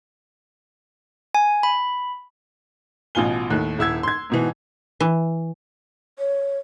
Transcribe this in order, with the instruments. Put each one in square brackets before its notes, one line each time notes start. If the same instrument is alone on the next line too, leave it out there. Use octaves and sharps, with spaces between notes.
[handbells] G#5
B5
[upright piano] A1 B2 F4 G#5 G7
D#2 A2 F#6
D#1 E4 E6 G#6
C6 G#6
G#2 B2 E3
[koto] E3
[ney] C#5